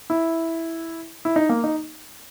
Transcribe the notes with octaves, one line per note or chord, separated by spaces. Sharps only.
E4
E4
D#4
A#3
D#4